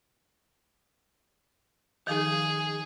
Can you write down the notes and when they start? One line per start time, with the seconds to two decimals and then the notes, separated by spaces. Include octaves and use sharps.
2.07 D#3 F3 D#4 G#4